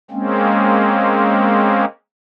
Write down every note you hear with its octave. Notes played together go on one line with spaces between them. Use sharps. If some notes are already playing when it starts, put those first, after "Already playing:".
G#3 A#3 C4 C#4